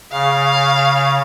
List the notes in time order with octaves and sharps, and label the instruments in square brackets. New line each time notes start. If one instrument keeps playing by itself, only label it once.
[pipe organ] C#3 [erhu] F5